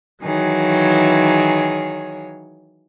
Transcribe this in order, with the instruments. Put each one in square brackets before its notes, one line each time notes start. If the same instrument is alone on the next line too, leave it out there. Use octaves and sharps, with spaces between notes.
[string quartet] D#3 E3 F#3 G#4 C#5